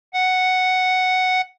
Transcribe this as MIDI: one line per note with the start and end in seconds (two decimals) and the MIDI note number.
0.14 1.41 78